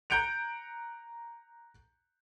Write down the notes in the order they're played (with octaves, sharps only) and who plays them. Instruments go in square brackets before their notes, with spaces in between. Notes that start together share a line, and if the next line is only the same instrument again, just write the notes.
[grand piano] A#5 F#6 G6 C#7 D7 F7